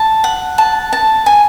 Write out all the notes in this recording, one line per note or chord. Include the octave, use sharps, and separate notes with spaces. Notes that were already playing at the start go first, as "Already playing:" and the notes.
Already playing: A5
F#5
A5
A5
G#5